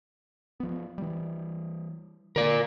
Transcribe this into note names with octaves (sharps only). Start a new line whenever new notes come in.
F3 B3
E3 G3
D3 A#3 A#4 D5